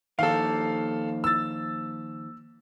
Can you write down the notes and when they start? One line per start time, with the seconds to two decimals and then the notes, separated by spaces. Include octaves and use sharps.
0.19 D#3 F3 A#3 A4 F5
1.24 E6 A6